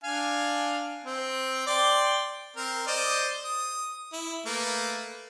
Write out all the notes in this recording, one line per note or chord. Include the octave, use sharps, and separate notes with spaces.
D4 F5 G#5
C4
D5 G5 C6
C4 A#4
C5 D5 D#5
D#6
E4
A3 A#3 B4